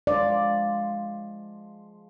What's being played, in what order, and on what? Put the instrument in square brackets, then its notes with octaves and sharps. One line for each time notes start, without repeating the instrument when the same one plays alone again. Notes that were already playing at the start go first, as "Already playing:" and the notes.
[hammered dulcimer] F3 G#3 [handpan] D5